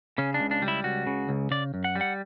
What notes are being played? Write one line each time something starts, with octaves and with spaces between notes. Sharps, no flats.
C#3 C#4
D4
C#2
D4
G3
E4
C#2 F#4
C#3
C#2
C#3 D5
F#2
F#5
G3
F#5